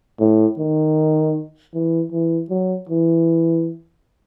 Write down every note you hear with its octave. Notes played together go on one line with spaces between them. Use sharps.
A2
D#3
E3
E3
F#3
E3